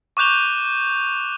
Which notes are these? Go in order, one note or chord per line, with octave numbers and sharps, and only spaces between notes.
C#6 D6 F#6 G6 F7 G7